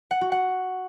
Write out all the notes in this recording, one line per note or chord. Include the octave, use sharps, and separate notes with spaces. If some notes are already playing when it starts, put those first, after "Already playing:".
F#5
F#4
F#5